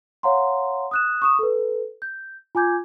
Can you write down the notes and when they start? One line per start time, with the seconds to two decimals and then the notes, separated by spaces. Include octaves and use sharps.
0.23 C#5 F5 F#5 A#5 C6
0.91 D#6 F#6 E7
1.22 C#6 D#6 E7
1.39 A4 B4
2.02 G6
2.55 F4 G#5 D6 G6 G#6